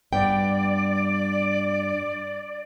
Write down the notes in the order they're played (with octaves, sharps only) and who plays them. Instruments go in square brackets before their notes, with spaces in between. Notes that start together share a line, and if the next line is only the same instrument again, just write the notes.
[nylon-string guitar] G2 B3 G5 [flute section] D5